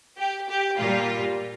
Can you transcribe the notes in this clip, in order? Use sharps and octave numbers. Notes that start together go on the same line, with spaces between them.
G4
G4
A#2 G3 F4